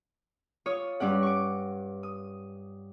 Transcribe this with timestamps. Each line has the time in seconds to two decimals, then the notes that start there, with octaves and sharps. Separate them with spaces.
0.66 F4 C#5 D#6
1.00 G2 C#4 D5 F#5
1.23 C#6 D6
2.03 D#6